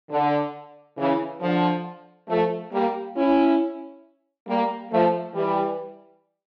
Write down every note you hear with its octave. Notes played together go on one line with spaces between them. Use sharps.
D3
C#3 E3
D3 F3
F3 A3
G3 A#3
C#4 E4
G3 A#3
F3 A3
E3 G3